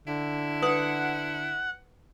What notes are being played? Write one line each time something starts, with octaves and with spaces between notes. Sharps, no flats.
D3 E4
B4 F#5 D#6